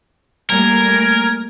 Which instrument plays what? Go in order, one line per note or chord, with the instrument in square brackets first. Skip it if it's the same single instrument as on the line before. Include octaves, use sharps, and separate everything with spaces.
[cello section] G3 A3 A#3 [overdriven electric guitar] A#4 [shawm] G#5